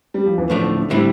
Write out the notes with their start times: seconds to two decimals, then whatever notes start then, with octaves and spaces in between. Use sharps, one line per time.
0.14 G3
0.26 F3
0.38 E3
0.50 A2 D3 F3 A3 D4
0.63 D3
0.77 D3
0.90 A2 D3 G3 C4 E4